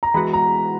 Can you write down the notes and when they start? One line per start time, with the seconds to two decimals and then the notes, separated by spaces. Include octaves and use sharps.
0.03 A#5
0.14 E3 G#3 B3 F#4 B5
0.33 A#5